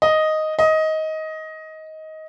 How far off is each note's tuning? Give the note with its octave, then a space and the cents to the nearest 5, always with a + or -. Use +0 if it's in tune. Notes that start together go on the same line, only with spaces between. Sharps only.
D#5 +0
D#5 +15